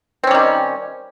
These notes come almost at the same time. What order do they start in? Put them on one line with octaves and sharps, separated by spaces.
C4 C#4 G3 D#3